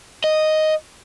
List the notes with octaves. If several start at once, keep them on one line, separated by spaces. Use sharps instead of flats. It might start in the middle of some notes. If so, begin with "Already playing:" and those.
D#5